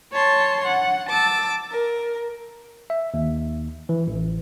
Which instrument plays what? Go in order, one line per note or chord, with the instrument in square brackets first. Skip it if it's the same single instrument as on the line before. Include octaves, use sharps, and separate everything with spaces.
[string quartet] C#5 A5 C6
F#5
A5 D6 E6
A#4
[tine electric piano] E5
D#2
E3
A1